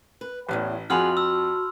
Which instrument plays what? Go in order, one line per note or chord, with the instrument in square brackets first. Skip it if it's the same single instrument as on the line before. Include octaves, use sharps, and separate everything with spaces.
[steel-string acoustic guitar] B4
[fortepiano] A1 [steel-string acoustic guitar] E2 A2 C3
[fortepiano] F2 [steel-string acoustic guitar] F4 G#4 F#5 [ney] F#4 [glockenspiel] B5 C6 F6
[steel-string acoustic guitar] A5 [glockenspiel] E6